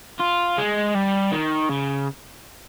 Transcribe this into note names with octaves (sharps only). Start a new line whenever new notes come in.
F4
G#3
G3
D#3
C#3